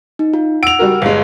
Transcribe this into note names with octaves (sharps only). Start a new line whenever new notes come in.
D#4
F4
F#5 E6 D7 F7
G3 F#4 A#4
G1 G#3 F5